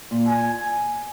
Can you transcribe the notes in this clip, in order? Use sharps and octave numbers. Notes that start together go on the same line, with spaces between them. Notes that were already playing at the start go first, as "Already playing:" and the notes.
A#2
G#5